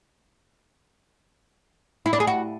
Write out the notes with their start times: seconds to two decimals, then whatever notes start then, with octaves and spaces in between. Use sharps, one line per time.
2.06 E4
2.13 D4
2.20 G#4
2.27 F#4